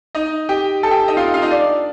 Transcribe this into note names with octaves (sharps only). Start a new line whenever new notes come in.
D#4 D#5
G4 G5
A4 A5
G4 G5
D#4 D#5
F4 F5
F4 F5
D#4 D#5
D4 D5